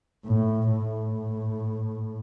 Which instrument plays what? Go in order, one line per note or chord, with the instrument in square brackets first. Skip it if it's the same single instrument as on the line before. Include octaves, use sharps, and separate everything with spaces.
[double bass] A2
A2